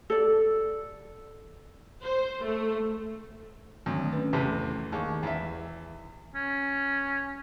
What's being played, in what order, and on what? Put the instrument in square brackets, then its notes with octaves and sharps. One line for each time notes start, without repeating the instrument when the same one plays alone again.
[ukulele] A4 D5
[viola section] C5
A3
[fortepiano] D2 [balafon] D#3 F#3 C4
[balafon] C#4 B4
[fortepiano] E2 C3 A3
[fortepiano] D#2 [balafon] G#4 C#6
[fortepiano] E2 E5
[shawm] C#4